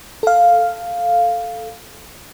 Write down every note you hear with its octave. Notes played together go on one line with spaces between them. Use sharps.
A4 F5